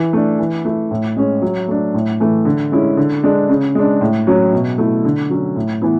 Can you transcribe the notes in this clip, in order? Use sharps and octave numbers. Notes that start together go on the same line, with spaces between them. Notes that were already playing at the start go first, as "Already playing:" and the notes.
Already playing: E3
A3 D4
E3
A3 E4
A2
G#3 C#4
F#3
A3 D4
A2
E3 A3
D3
G#3 C#4 E4
D3
G#3 D4
C#3
G#3 D4
A2
F#3 C#4
B2
A3 E4
D3
F#3 C#4
A2
E3 B3 E4